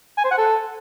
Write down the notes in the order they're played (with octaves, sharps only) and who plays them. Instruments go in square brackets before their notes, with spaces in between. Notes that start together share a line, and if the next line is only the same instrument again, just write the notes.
[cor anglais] G#5
C5
F#5
A4